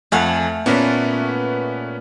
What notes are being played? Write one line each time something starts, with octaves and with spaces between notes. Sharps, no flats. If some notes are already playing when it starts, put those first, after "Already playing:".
F2 A3 F5 F#5 G#5
A#2 A3 B3 C#4 B4